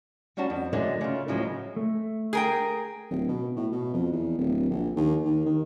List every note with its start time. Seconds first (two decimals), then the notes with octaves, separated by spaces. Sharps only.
0.37 G3 C#4 D4 F#4 A5
0.50 F2
0.73 D3 F#3 G#3 A3
1.01 C#3 F4
1.28 D2 A2 C#3 F3 F#3 G#3
1.76 A3
2.33 G#4 A#4 G5
3.11 D1
3.29 B2
3.57 A2
3.72 B2
3.93 F2
4.12 E2
4.38 D1
4.70 A#1
4.96 D#2
5.25 D#2
5.46 D#3